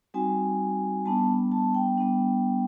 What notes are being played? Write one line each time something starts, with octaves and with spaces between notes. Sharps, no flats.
G3 C4 D#4 F#4 G#5
G3 B3 D4 A5
A5
G5
G3 B3 D4